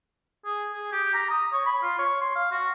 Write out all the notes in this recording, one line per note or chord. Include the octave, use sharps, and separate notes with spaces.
G#4
G#4
G4
A#5
D#6
C#5
B5
F4
C#5
C6
F5
F#4